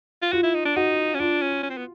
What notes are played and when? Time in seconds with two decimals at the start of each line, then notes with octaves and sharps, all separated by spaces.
0.22 F4
0.32 F4 F#4
0.43 E4
0.54 D#4
0.65 D4
0.76 D#4 F#4
1.14 C#4
1.20 D4 F4
1.42 C#4
1.63 C#4
1.70 C4
1.77 B3